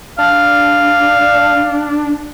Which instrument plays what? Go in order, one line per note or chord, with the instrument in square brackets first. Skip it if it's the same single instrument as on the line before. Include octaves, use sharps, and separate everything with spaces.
[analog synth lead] D4 [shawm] F5